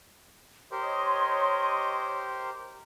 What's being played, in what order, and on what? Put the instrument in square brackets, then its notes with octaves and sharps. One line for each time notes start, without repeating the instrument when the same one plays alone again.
[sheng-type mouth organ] G4 A#4 C5 [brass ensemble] C#5 D#5 [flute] C6